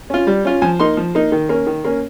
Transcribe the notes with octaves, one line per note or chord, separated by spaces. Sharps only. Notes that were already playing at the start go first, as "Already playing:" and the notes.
C#4 F4
G3
C#4 F4
F3 G#5
A#3 D#4 C6
F3
A#3 D#4
D#3
A#3 C#4
D#3
A#3 C#4